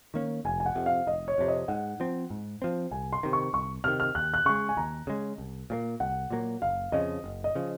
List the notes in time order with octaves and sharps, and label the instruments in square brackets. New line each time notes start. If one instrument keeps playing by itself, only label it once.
[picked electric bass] D#3 A#3 C#4
[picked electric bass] F1 [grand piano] G#5
[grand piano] G#5
F#5
[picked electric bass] F2 C3
[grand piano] F5
[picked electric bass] F1 [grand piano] D#5
[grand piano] C#5
[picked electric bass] F2 C3
[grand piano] D#5
[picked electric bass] G#2 [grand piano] F#5
[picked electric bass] F3 C4
G#2
F3 C4
[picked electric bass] C2 [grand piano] G#5
[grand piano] C6
[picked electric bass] C3 D#3
[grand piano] C#6
[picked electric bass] C2 [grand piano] C#6
[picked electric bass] C3 D#3 [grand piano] F6
[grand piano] F6
[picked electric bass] D#2 [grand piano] F#6
[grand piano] F#6
[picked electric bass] C#3 G#3 [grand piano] C#6
[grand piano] G#5
[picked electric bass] D#2 [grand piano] A#5
[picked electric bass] C#3 G#3
C2
A#2 F#3 A#3
[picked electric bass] C2 [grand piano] F#5
[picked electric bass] A#2 F#3 A#3
[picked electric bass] F#1 [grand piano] F5
[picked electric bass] F2 C#3 F3 [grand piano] D#5
[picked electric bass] F#1
[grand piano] D#5
[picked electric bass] C#3 F3